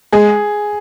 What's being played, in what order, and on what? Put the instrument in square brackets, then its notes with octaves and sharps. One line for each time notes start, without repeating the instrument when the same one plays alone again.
[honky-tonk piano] G#3 [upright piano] G#4